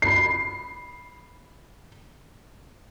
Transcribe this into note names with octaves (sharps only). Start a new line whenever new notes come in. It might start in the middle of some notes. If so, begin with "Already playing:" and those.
B5 C7